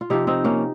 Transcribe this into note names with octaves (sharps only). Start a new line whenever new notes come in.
F4
C3 F3 D#4 G4
C4 D#4
A#3 C#4